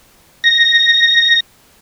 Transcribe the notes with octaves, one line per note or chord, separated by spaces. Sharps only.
A#6